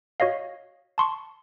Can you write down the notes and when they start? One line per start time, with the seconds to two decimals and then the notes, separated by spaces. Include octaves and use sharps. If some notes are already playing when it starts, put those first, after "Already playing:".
0.20 F#4 C#5 D#5 F5
0.98 A5 C6 C#6